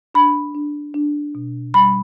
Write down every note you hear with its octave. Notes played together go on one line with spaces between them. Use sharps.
D4 B5
D4
D4
B2
G3 B5